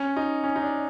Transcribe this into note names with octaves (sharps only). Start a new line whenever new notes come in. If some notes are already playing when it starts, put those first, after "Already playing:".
Already playing: C#4
D#4
C#4
D#4
D4